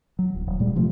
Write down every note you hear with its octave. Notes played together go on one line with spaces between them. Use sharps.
F#3
D1
D#1
A#2 G3 G#3
C3 F3 A3